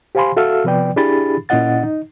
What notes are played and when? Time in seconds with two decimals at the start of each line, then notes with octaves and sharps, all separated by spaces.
0.15 G4 C5 F5 G#5 B5 C6
0.37 F#4 A4 E5 F5 E6 F6
0.64 C3 F3 B3 B4 D5 G5
0.96 D4 E4 G4 G#4 B5 A6
1.49 A#2 C#4 E4 D#5 F#5 A6
1.83 D#4